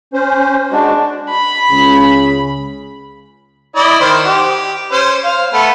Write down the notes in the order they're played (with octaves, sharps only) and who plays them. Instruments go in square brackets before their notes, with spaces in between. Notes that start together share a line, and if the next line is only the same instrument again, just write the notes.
[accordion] C#4 C5
[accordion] G#3 F#4 [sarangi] D4
[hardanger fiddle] B5
[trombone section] C#2 C#3
[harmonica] E4 D5 D#5
D#3 C5
G4
C#4 C5
F5
A3 B3